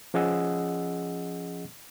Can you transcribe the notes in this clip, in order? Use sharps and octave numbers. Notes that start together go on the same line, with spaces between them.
F3 C#4 G#4 D#5 F#5 E6